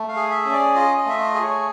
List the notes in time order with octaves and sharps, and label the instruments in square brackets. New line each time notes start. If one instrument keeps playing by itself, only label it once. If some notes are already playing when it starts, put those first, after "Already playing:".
Already playing: [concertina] A3
F5
G#4
E5
C#4
D5
F4 D#5
D#5
A3 E5
D#5
G#4
C#5